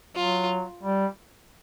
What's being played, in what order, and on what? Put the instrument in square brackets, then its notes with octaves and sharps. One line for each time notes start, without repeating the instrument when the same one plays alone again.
[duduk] F#3 [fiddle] F4
[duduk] G3